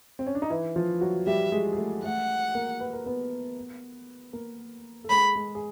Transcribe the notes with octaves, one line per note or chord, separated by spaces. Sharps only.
C4
C#4
D4
D#4
E3 E4
F3 F4
F#3 F#4
G3 G4 E5
G#3 G#4
G#4
A3 A4
A3 A4 F#5
A#3 A#4
B4
A#4
B3 B4
A#3 A#4
A4
G#3 G#4 B5
G#3 G#4
G#4